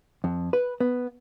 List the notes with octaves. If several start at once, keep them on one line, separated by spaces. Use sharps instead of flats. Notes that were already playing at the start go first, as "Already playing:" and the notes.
F2
B4
B3